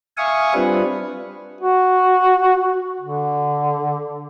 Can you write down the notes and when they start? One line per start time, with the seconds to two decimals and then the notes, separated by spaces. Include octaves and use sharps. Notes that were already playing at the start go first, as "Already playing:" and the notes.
0.17 E5 F5 G#5 C#6 D#6
0.54 G3 C4 D4 F4 B4
1.61 F#4
3.01 D3